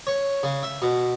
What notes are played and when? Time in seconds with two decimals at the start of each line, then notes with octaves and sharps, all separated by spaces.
0.07 C#5
0.43 C#3
0.63 E5
0.82 B2